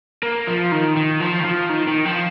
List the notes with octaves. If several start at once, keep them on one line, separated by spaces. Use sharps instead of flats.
A#3
F3
D#3
D#3
F3
D#3
F3
D#3
D#3
F3